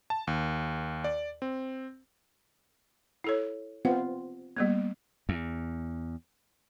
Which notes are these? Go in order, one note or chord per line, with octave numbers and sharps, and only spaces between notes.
A5
D#2
D5
C4
E4 A4 C#5
B3 C4 F4 F#5
G3 A#3 B3
E2